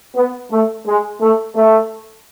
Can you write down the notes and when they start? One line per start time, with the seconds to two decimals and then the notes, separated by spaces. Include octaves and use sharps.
0.15 B3
0.51 A3
0.85 G#3
1.20 A3
1.55 A3